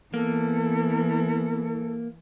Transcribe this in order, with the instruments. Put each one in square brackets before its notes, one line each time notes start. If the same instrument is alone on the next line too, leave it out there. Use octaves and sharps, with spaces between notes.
[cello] E3 [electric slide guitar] A#3 [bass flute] B3 [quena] A4